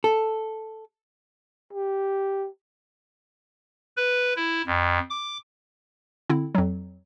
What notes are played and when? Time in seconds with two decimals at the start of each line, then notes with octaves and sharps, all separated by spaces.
0.04 A4
1.73 G4
3.97 B4
4.36 E4
4.67 F2
5.10 D6
6.30 D3 C4 E4
6.55 F2 F#3